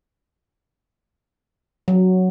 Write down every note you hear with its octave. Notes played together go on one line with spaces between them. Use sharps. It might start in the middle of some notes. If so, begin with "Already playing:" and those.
F#3